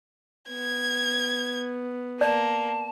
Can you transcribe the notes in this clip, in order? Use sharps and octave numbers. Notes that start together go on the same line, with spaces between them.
B3 G#6
A#3 D5 A5